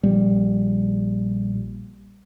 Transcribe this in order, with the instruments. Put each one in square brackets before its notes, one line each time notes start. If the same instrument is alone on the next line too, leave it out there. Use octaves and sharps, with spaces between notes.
[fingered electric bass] A#1 G3